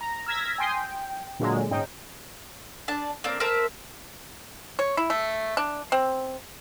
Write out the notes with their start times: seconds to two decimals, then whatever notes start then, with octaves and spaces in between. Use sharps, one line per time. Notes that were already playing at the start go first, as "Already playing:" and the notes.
0.01 A#5
0.26 E6 F6 G#6 A#6 B6
0.58 G5 G#5 C6 D#6
0.75 G5
1.39 A#2 D3 F#3 G#3
1.71 G#2 C#4 D#4 G5
2.88 D4 A5
3.24 A#3 C4 D4
3.40 A#4 C5 E5 A5
4.79 C#5
4.97 E4
5.10 A3
5.57 D4
5.92 C4